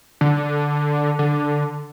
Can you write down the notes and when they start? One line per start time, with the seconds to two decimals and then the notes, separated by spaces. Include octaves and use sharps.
0.21 D3
1.19 D3